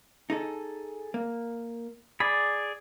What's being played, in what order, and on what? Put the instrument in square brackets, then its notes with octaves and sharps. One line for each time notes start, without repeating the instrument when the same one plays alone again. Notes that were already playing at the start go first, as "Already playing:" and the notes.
[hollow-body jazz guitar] D#4 G#4 A4
A#3
[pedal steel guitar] G#4 D5 [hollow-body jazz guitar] B5